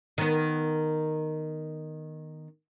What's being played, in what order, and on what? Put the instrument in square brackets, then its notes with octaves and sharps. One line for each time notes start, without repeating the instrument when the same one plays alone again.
[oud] D#3 B3